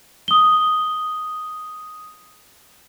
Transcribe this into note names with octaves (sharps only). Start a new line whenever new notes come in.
D#6 G7